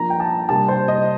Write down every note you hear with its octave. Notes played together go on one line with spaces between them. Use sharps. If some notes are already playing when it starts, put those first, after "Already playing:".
Already playing: F3 A#3 D4 A#5
G5
A5
C3 G3 A#3 D4 A5
C5
D#5